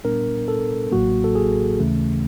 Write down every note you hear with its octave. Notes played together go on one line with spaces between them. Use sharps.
A#2 G3 B3 D4 A#4
A4
A1 A2 F#3 A#3 F#4
A4
G#4
D#2 C#3 E3 A3 C#4